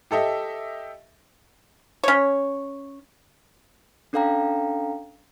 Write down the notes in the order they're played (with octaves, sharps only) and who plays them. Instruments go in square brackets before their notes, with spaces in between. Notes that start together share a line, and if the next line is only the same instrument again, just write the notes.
[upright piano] G4 A4 D#5 E5
[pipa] C#4 C#5
[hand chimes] C#4 D4 A4 F5 G5 A#5